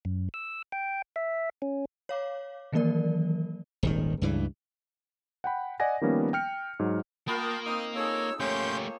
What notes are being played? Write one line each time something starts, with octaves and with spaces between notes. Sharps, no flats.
F#2
E6
G5
E5
C#4
C#5 F5 D6
D#3 E3 F#3 A#3 A#4 D5
D#1 G#1 D#3
C#2 G2 E3
F#5 G5 B5
D5 D#5 F#5 G#5 A#6
D#3 F3 G3 A#3 B3 C#4
G5 F6 C#7
G#2 F#3
A#3 B3 F4 A#4 G5 A5
C4 D#4 D#6 F6
D#4 G#4 A4 C#5 E6
A3 A#3 C#4 G4 C5 C#5 C6 G6